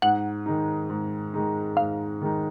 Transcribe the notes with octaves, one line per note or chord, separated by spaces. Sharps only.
G#2 F#5
D#3 G#3 D#4
G#2
D#3 G#3 D#4
G#2 F5
D#3 G#3 D#4